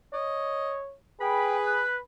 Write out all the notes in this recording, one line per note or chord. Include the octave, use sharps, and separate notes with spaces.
C#5 D#5
G#4 B4 G5 B5
F#6